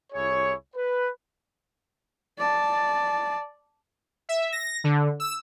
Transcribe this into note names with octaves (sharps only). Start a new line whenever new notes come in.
C2 E4 G#4 C#5
B4
D5 A5
E5
A#6
D3
E6